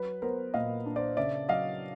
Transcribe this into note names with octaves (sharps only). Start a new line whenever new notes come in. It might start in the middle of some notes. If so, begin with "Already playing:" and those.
Already playing: F#3 B4
B3 A#4 C5
A#2 D#5 F5
D4
C5 D5
C#3 D5 E5
F#3 D#5 F5